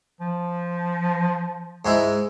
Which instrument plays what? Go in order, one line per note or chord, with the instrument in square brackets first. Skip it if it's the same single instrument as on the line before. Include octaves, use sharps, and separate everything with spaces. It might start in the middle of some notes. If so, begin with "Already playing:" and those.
[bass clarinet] F3
[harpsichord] G#2 G#3 E4